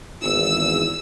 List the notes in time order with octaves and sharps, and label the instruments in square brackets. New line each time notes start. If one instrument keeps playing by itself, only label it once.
[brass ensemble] G#1 E2 [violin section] E6